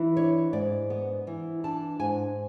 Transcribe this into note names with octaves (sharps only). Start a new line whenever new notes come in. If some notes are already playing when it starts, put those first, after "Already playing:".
Already playing: E3
D4 C#5
G#2 D5
B3
E3
D4 A5
G#2 G#5